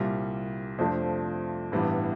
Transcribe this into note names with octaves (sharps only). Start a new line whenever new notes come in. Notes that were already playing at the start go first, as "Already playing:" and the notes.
Already playing: C2 A#2 G3
F2 C3 F3 A3 D4
A1 G2 E3 G3 B3